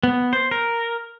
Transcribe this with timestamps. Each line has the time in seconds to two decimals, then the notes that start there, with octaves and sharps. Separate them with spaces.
0.03 B3
0.33 C5
0.51 A#4